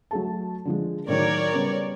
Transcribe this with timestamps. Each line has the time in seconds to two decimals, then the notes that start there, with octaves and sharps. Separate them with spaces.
0.11 F#3 A3 A5
0.65 D3 F3 G#3
1.08 A2 D#3 F#3 A#4 C#5 D5
1.54 C#3 G3 B3